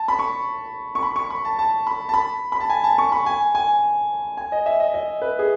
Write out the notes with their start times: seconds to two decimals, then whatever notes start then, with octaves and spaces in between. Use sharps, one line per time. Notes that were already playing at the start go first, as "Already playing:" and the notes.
Already playing: A5
0.08 B5
0.19 C#6
0.95 C#6
1.03 B5
1.16 C#6
1.30 B5
1.45 A5
1.59 A5
1.87 B5
2.09 A5
2.14 B5
2.52 B5
2.60 A5
2.69 G#5
2.84 A5
2.98 C#6
3.12 B5
3.26 G#5
3.55 G#5
4.37 G#5
4.52 D#5
4.66 E5
4.80 D#5
4.94 D#5
5.22 B4
5.39 G#4